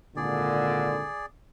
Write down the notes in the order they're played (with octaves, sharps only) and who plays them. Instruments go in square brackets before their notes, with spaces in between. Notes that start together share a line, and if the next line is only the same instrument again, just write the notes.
[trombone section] G#1 A#2 D3 [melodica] G#4 D5